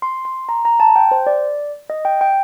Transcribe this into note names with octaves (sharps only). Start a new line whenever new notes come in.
C6
C6
A#5
A#5
A5
G5
C5
D5
D#5
G5
G5